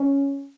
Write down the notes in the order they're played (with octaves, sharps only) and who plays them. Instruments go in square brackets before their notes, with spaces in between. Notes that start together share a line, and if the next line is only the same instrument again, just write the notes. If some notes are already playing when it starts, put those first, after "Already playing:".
Already playing: [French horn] C#4